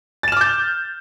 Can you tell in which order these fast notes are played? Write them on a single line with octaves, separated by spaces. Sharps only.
A6 E7 F6 D6 G6